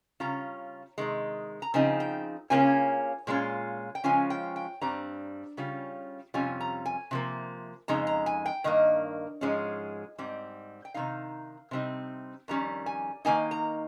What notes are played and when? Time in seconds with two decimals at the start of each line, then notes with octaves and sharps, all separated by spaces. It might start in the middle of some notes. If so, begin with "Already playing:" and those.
0.20 C#3 G3 C#4 F4 A#5
0.98 C3 D#3 G#3
1.62 A#5
1.74 C#3 F3 C4 D#4 G#5
2.00 G5
2.50 C#3 F3 A#3 C#4 F4 G#5
3.27 A#2 G#3 C#4 F4
3.95 G5
4.04 C#3 F3 G#3 C#4 F4 G#5
4.30 G5
4.56 G5
4.81 G2 G3 C4 A#5
5.57 C#3 G3 C#4 F4
6.34 F2 C3 G3 C#4 F4 G#5
6.61 A#5
6.86 G#5
7.11 C3 F3 A#3
7.88 F2 C#3 G#3 D#4 A#5
8.07 A#5
8.26 G#5
8.46 G5
8.64 G2 D#3 A#3 D#5
9.41 G#2 F3 G#3 C#4
10.18 G#2 G3 C4
10.85 G5
10.94 C3 D#3 G#3 D#4 F5
11.71 C3 G3 C4 D#4
12.48 F2 D#3 G3 C#4 A#5
12.86 G#5
13.25 D#3 A#3 D#4 G#5
13.51 A#5